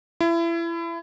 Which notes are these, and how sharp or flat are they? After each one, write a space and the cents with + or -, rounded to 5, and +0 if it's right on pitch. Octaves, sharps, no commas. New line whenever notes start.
E4 +30